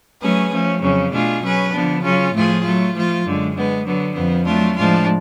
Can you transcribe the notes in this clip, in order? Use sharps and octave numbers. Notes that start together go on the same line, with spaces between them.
F#3 A3 C#4 G#4 B4
F3 A3 C#4
F2 C#3 F#3 C#4
B2 A3 D4 F4 G#4
F#3 C#4 G#4 B4
D3 F3 B3 D4
C#3 F#3 C#4 F4
A2 F3 A3 F4 G#4
F#3 A3 F4
F3 A3 F4
F#2 D3 G#3
D3 G#3 B3
D3 F#3 B3
F2 F3 B3
F#3 A3 D4 F4
A2 F3 G#3 D4 F4